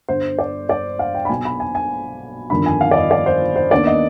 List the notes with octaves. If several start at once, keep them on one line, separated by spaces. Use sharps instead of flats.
G1 G2 D3 C5
D5
D5
F5
G5
B5
B1 B2 B3 G#5
B5
G#5
G#5
G1 F2 D#3 G3 D4 B5
G#5
F5
D5
D#5
D5
C5
C5
D#2 D#3 B3 D4 D5
D#5